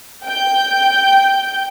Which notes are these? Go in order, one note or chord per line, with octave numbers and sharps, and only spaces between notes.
G5 G6